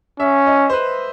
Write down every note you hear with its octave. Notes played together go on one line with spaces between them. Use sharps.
C#4 E5
D#5
C5
B4